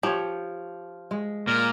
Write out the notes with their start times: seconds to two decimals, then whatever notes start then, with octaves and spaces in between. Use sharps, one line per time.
0.03 F3 G4 C#5
1.11 G#3
1.47 A#2 A#4